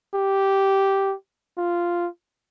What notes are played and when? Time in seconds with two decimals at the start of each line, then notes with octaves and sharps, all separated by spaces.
0.15 G4
1.58 F4